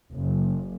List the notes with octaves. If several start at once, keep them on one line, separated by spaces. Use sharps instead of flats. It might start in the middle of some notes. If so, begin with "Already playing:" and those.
F#1